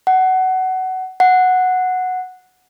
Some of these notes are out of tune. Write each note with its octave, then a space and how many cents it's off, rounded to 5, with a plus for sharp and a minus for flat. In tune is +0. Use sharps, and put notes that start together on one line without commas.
F#5 +20
F#5 -5